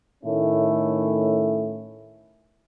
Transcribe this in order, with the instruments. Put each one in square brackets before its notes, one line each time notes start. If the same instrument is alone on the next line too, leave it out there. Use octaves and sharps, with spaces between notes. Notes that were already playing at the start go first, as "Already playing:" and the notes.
[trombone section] A2 D#3 A3 C#4 E4